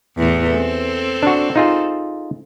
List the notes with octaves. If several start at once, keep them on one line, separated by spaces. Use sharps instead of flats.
E2 A2 E3
C4 A4
D4 F#4
D#4 F4 G#4